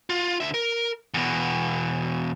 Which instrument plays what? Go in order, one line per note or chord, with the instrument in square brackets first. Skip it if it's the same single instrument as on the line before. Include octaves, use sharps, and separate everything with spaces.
[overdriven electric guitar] F4
D3 E5
A#4
E2 B2